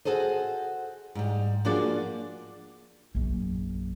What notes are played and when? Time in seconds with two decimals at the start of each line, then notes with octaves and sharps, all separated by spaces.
0.05 F#4 G#4 A4 C5 D#5
1.15 G#2 G3
1.65 F3 A#3 D4 F#4 G#4 D5
3.15 A#1 F#2